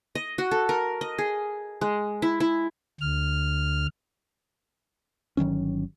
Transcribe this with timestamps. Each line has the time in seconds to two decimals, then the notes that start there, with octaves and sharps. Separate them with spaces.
0.15 D#5
0.38 F#4
0.51 A4
0.69 A#4
1.01 D#5
1.18 G#4
1.81 G#3
2.22 E4
2.40 E4
3.01 D2 F6
5.37 G1 D#3 F#3 C#4